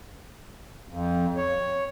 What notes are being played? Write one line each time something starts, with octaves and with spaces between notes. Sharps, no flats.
F2
C#5